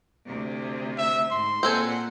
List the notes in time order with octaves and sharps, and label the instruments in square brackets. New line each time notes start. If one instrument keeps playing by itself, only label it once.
[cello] D2 C3
[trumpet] E5
[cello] G#2 [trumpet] C6
[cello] A#2 F#5 [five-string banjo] C4 A4 G#5